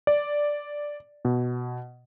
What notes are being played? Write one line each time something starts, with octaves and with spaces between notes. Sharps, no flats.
D5
B2